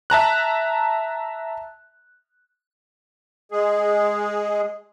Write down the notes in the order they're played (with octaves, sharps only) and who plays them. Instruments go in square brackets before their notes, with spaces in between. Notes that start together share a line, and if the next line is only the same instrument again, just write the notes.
[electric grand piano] E5 A5 A#5 F#6
[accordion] G#3 G#4